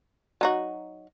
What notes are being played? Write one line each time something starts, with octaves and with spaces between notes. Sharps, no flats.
F#3 D#4 F#4